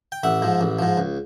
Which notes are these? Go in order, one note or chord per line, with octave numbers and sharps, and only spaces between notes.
G5
A1 E5 F#5
G#2 F3
A1
G#2 F3
C#2